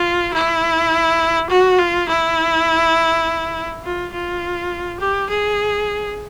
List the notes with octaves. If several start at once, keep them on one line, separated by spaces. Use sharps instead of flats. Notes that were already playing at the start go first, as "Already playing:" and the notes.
Already playing: F4
E4
F#4
F4
E4
F4
F4
G4
G#4